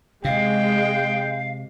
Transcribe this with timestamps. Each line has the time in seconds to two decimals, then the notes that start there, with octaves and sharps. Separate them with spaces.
0.25 C3 G#3 F5 G5